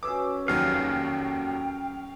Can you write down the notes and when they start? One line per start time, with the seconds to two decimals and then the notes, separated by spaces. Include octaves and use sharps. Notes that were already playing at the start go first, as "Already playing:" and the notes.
0.03 F#2 G#4 B4 E5 D6 E6
0.48 F1 D#2 F#3 C#4 E5 F5 G5